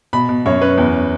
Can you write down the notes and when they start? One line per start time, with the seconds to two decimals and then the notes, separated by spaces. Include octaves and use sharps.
0.13 B2 B5
0.29 B2
0.46 F#2 C#5
0.61 C#4 B4
0.78 E2